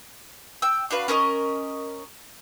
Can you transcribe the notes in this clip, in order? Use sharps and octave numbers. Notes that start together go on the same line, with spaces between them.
G5 E6
D4 F#4 B4 F5
C#4 A#4 B4 D#5